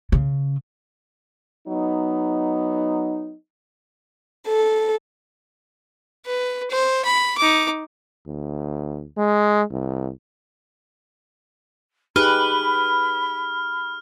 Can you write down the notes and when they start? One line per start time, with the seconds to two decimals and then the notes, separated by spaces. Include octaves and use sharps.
0.12 C#3
1.68 F#3 B3 D#4
4.47 A4
6.26 B4
6.71 C5
7.05 B5
7.38 D#4 D6
8.26 D2
9.17 G#3
9.71 C2
12.16 D#4 G4 G#4 B4 B5 F6